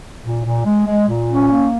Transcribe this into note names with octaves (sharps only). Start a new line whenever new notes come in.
A#2
A#2
G#3
G#3
A#2
C#4
A#3